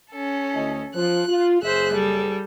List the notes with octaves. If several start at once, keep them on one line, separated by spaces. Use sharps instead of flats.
C#4 A4
D2 E4 D#5
F3 F#6
F4
F#1 G#4 C5 E5 F#6
G3 A4